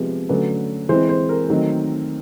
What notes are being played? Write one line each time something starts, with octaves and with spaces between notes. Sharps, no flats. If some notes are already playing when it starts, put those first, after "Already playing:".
Already playing: C3 F3 G#3 B3
D3 F#3 A3 C#4 B4
E3 G#3 C4 C5
C5
A#4
D#3 F#3 A3 C4